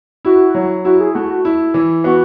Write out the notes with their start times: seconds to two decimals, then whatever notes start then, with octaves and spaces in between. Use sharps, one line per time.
0.25 E4 F#4
0.54 F#3
0.85 E4 F#4
1.00 G#4
1.14 A3 F#4
1.30 F#4
1.45 E4
1.74 E3
2.04 B3 F#4